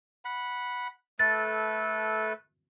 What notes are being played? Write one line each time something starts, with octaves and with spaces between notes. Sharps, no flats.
F#5 B5
A3 A4 B4 A6